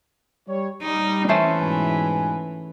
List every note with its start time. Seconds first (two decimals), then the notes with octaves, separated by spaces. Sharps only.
0.48 G3 C#5
0.83 G3 D#4
1.29 E3 A3 C#4 C5
1.60 G#2 B2 G#5